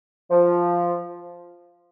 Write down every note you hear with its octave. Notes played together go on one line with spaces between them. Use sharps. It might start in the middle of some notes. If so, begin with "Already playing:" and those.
F3